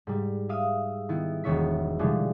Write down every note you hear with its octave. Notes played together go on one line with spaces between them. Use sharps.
G#2 G3
E5 F5 D#6 D#7
D#3 B3 E4
E1 D#3 B3 C#5 E5 B6
B2 D3 E3 F3 G3 G#3